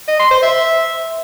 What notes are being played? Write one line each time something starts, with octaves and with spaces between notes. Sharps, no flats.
D#5
C6
C5
E5